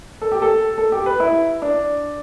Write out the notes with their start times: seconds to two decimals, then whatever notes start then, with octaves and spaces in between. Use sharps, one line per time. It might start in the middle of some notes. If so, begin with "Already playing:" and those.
0.22 A4
0.32 G4
0.42 A4
0.78 A4
0.92 G4
1.06 B4
1.20 E4
1.62 D4